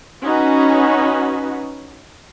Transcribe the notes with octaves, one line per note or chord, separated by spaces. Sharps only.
C#4 D#4 F#4 B4